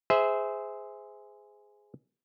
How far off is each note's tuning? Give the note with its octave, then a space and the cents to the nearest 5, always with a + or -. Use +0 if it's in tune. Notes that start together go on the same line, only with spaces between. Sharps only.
G#4 +0 C5 -20 E5 -15